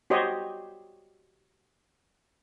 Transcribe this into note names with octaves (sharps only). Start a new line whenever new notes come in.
F#4 G4 C5 C#5 D#5